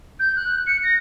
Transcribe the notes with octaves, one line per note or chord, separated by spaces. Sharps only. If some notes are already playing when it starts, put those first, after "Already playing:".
G6
F#6
C#7
A#6